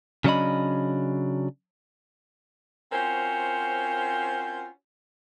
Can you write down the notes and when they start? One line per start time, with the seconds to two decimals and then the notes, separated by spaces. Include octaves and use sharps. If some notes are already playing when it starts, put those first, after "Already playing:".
0.24 C#3 F#3 C#4 D4 D#5 B5
2.92 C4 C#4 F4 F#4 A#4 C5